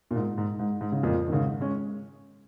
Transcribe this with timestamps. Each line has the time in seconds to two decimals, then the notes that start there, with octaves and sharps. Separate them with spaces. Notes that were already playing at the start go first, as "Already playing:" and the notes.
0.11 A#2
0.16 G#2
0.38 G#2
0.59 G#2
0.81 G#2
0.92 C#3
1.03 F2 A#2
1.28 D#3
1.32 G#2 C#3
1.61 G#3 C#4